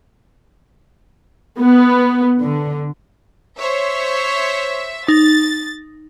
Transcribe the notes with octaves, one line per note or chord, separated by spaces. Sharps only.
B3
D3
C5 C#5 E5
D#4 A6